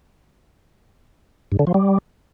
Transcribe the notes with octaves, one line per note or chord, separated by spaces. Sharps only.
G2
D3
F3
G3